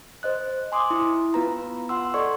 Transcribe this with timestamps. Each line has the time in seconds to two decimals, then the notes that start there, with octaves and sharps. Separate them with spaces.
0.23 C5 D#5 F#6
0.72 G#5 C6 D6 D#6
0.90 E4
1.34 B3 F4 B4 A#5
1.89 F4 F#5 C6 E6
2.14 A4 D5 D#5 C6 C#6